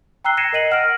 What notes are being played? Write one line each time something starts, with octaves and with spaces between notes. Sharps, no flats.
G5 A#5 E6 F#6 C7 G7
G#6 A#6 C7 C#7 D#7 E7
A#4 D#5 D#7 F#7
F#5 F6 A#6 D7